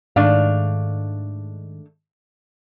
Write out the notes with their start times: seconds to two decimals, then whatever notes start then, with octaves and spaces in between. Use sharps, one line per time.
0.16 G#2 D#3 A3 D4 F5